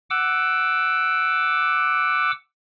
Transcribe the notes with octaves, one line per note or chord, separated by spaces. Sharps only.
F#5 D6 E6